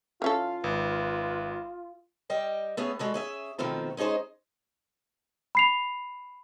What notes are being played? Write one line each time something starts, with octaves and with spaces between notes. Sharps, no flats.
E3 C#4 F4 A4 F5
G#1 B4
G3 D#5 G5
A3 B3 C#4 G#4
G3 G#3 F#4 A4
C#4 G#4 E5
B2 D#3 F3 A3 C4 F4
G#3 C#4 D#4 G#4 C5
B5 C7 F7